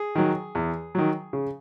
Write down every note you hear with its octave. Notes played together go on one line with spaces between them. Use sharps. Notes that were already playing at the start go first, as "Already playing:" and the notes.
Already playing: G#4
D#3 F#3
E2
D#3 F#3
C#3